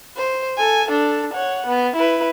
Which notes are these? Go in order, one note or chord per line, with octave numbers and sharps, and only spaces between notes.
C5
A4 G#5
D4 A4
C#5 F#5
B3
E4 B4